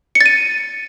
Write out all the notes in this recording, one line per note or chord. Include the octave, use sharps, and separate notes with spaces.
C#7
A6
D#7